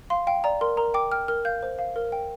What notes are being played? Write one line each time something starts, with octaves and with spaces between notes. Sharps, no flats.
F5 C6
F5 G5
D5 A#5
A#4 C6
A#4 A#5
G5 D6
G5 F6
A#4 F6
F5 G6
C5
F5
A#4
G5